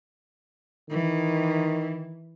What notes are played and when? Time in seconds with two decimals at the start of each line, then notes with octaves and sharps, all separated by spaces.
0.90 D#3 E3